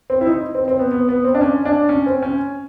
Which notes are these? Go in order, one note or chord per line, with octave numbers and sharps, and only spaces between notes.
C4
E4
D#4
C4
C4
B3
B3
B3
C4
D4
C#4
D4
C#4
C4
C#4